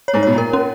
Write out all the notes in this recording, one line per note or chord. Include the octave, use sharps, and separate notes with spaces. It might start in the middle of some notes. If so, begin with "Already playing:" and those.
C#5
G#2
B2 C#5
A#2
A#4
C#4